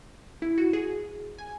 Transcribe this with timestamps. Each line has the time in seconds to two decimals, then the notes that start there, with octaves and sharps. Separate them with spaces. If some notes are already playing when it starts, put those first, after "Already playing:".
0.42 E4
0.58 F#4
0.73 G#4
1.38 G#5